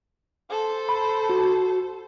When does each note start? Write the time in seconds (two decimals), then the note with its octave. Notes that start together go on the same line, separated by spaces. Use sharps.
0.50 A4 C5
0.89 B5
1.30 F#4